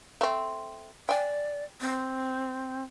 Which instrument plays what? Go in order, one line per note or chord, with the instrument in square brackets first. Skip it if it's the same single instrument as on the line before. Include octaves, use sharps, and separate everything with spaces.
[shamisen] A3 C4
[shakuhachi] D5 [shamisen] G5 G#5
[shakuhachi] C4